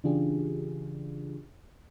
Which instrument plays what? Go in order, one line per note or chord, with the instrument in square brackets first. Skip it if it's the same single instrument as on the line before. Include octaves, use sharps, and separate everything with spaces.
[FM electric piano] C#3 E3 D4 F4 G4 G#4